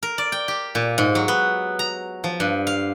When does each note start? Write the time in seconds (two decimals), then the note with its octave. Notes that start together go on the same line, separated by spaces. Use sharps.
0.03 A#4
0.18 D5
0.32 G5
0.48 G4
0.75 A#2
0.98 G#2
1.15 F#3
1.28 B3
1.79 A#5
2.24 F3
2.40 G2
2.67 F5